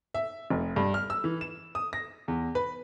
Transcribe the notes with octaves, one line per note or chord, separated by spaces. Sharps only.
E5
F1
G2
F6
E6
E3
E7
D#6
A#6
E2
B4